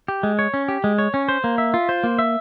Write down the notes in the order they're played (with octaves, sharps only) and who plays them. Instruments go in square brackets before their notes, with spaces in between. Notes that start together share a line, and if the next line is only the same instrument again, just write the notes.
[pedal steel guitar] G4
G#3
C#5
C#4
G4
G#3
C#5
C#4
C5
A#3
E5
F4
C5
A#3
E5